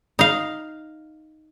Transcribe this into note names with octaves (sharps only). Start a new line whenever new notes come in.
D#4 F5